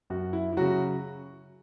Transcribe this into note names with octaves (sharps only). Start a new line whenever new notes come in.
F#2 F#4
E4
E4
C#3 F#3 F#4